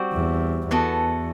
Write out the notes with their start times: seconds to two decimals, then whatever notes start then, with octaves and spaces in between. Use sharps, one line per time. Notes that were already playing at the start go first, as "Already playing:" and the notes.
Already playing: G3 C4 F#4
0.13 E2
0.71 E2 E3 B3 F#4 A4